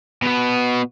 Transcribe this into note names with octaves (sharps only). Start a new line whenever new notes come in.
B2 B3